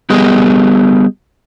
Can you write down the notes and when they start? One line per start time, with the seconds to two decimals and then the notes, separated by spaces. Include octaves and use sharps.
0.10 G3 B3 G4 G#4 D#5